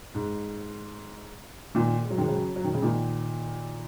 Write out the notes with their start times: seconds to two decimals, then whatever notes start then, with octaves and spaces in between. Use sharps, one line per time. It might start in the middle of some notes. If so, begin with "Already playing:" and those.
0.15 G#2
1.75 A#2 D#3
2.02 G#3
2.10 F#3
2.18 D#3 G#3
2.28 C#3 F#3
2.56 F#3
2.64 D#3
2.74 C#3
2.82 A#2 D#3